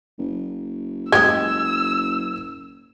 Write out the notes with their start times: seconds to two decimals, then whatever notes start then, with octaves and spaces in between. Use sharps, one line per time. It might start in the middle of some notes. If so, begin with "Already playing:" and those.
0.18 F#1
1.12 G#3 G4 D#6 E6 G#6